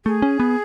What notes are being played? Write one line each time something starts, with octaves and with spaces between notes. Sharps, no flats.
A3 G#4
C#4
B3